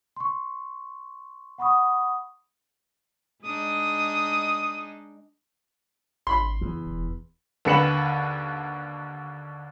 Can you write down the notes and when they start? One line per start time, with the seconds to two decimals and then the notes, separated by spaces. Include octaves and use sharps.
0.16 C6 C#6
1.58 F#5 B5 C#6 D#6
3.44 G#3 D4 D#4 D#6
6.27 G#1 B5 C6
6.61 F#1 E2
6.87 E1
7.65 D#2 D3 B4 C#7 E7 F#7